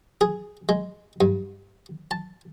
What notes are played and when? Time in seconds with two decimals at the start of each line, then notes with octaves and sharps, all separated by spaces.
0.21 G#4
0.69 G#3
1.21 G2
2.11 A5